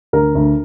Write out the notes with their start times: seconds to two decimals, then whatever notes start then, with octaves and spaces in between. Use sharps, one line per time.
0.13 D2 A#4
0.35 D2